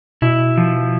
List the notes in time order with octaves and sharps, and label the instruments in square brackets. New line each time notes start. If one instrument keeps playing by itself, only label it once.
[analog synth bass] B2 [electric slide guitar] E4
[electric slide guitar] F3